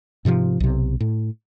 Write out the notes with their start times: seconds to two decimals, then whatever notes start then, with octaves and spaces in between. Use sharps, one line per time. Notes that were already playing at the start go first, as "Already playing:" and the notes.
0.25 G#2 C3 D#3 F3
0.60 B1 C3
1.00 A2